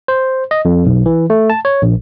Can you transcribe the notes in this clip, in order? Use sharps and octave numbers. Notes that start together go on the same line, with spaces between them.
C5
D#5
F2
B1
E3
A3
A5
C#5
A#1